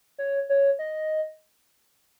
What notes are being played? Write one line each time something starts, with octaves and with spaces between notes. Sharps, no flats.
C#5
C#5
D#5